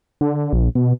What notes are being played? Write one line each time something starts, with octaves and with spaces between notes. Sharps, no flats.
D3
A#1
B2